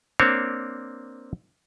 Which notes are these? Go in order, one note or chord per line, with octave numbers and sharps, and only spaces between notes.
A#3 C4 D4 C5 C#5